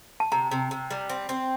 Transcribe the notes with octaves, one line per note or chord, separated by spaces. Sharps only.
A5
C3 A#5
C3
C3
G3
C4
C4